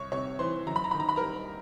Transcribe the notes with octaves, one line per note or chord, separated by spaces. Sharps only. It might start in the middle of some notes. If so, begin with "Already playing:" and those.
Already playing: C2 C#5 C#6
C3 C#5 C#6
E3 C5 C6
F#2 A#5
B5
A#5
D#3 B5
A#5
B5
G3 A#4 A#5